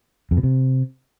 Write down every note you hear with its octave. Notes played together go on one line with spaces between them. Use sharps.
F2
B2
C3